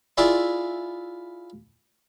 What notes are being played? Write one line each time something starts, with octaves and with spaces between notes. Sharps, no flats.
E4 F4 G#4 D5 E5 C6